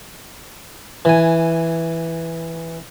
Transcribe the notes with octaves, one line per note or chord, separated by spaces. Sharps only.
E3 G#5